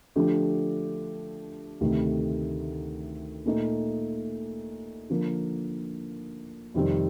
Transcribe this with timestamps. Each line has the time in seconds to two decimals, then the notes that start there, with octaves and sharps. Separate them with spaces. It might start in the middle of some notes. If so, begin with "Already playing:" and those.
0.16 D3 F3 A3 D4 G4
1.80 D2 C3 D#3 A3
3.46 A#2 A3 D#4
5.10 D3 F3 A#3
6.74 F2 C3 D#3 G3 C4